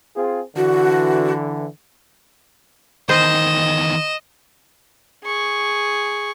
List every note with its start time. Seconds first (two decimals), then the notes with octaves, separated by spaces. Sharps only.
0.16 C4 F4 G#4
0.56 D3 E3 F#4
3.09 E2 D#3 C5 D#5 E7
5.24 G#4 C#6